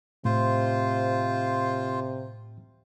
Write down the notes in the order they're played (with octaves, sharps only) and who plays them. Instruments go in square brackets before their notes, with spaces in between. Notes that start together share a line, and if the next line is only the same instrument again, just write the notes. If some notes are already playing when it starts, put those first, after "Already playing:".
[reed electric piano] A2 [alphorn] C3 [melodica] F4 C5